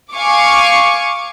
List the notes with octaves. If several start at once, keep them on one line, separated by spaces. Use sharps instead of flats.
F5 G#5 C#6 D6